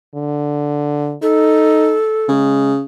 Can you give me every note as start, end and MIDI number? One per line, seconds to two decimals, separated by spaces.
0.15 1.16 50
1.22 1.97 63
1.22 2.29 69
2.29 2.84 49
2.29 2.73 56